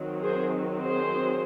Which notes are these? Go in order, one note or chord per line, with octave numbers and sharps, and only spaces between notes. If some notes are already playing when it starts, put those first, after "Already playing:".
Already playing: D#3 F#3 C4
G#4 C5
G#4 C5